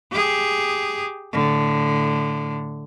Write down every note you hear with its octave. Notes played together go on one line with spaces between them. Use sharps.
G4 G#4
A2 D3